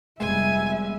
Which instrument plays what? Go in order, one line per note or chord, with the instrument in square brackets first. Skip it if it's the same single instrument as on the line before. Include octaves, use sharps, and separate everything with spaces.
[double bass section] F1 G3 B3 [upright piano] G#3 [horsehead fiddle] E5 [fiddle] G#5